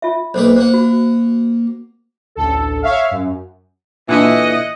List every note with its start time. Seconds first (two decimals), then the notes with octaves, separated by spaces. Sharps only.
0.02 F4 E5
0.34 B1 A#3 B4 C5
0.56 A#3 C5 F#5
0.74 F#4
2.36 A1 D2 A4
2.82 C#5 E5 F5
3.11 F#2
4.09 A#2 D3 E3 D#5 E5 F#5